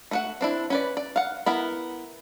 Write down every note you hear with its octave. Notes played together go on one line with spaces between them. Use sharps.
A3 F#4 F#5
C4 D4 E4
C#4 B4 D5
D5
F5 F#5
B3 E4 A#4